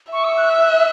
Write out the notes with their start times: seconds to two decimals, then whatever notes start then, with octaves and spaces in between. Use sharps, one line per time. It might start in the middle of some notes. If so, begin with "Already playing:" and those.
0.12 E5 C#6
0.24 E6
0.37 F#6
0.50 E6
0.62 F#6